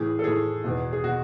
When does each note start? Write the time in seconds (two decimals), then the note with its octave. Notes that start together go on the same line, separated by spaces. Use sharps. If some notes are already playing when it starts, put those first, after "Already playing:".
Already playing: A2 E3 G#4
0.19 A4
0.23 A2 E3 G#4
0.64 E2 B2
0.93 G#4
1.04 B2 F#4